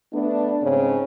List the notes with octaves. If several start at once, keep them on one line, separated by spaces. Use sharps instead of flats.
A3 B3 D4
G#2 C#3 C4 C#4